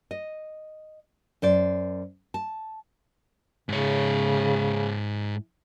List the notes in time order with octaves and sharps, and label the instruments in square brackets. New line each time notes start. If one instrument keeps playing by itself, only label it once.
[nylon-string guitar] D#5
F#2 C5 D5
A5
[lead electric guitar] G#2 C#5 [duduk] C#3